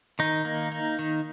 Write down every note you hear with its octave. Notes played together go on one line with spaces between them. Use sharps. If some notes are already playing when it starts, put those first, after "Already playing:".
D#3 D#4
A#3
A#3
D#3